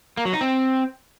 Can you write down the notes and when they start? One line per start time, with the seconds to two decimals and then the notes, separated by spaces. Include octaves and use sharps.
0.17 A#3
0.25 F#3
0.33 D#4
0.41 C4